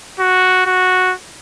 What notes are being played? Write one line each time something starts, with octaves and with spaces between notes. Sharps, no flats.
F#4
F#4